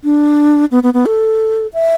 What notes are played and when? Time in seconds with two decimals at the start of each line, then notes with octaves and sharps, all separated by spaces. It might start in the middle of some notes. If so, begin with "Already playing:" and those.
0.04 D4
0.71 B3
0.83 B3
0.94 B3
1.06 A4
1.74 E5